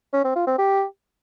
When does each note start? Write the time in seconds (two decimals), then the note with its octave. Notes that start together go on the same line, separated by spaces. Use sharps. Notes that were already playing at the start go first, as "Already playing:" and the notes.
0.13 C#4
0.24 C4
0.36 F4
0.47 C4
0.58 G4